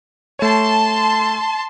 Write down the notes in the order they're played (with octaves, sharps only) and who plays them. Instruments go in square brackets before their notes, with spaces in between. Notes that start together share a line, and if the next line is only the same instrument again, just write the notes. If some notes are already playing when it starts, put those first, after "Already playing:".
[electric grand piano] A3 C#5 [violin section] A5 C6